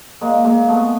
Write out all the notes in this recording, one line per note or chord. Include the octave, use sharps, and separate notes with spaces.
G#3 A#3
G#3 A#3
A3 B3